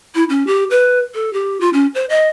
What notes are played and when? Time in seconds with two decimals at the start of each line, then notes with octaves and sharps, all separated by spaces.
0.15 E4
0.30 C#4
0.47 G4
0.70 B4
1.14 A4
1.33 G4
1.61 F4
1.73 C#4
1.95 C5
2.10 D#5